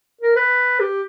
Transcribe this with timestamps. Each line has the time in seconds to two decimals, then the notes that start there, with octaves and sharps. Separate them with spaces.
0.21 A#4
0.36 B4
0.80 G4